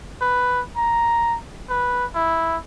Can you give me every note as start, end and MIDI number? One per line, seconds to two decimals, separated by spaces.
0.21 0.61 71
0.77 1.37 82
1.69 2.05 71
2.15 2.57 64